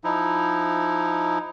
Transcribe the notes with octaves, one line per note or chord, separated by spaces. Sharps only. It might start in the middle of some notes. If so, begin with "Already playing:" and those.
F3 D#4 E4